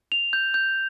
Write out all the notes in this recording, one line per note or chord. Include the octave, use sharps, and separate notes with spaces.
F7
G6
G6